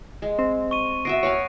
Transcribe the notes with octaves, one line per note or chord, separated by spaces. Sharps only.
G#3
C4
C#6 D#7
B3 F#4 E5 A#6 C7 D7
B4 C#5 F5 G#5